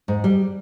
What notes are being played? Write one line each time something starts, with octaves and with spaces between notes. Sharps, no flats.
G#2
G3